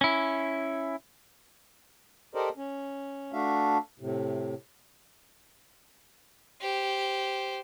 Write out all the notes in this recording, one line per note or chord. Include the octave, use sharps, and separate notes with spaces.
C#4 E4
G4 A4 A#4 C5 D5 D#5
C#4
A3 D4 F#4 E5 F5
A2 C3
G4 C5